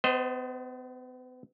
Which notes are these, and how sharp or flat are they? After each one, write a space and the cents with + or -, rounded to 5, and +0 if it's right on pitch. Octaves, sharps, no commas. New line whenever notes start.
B3 +40 C5 +0 D#5 +0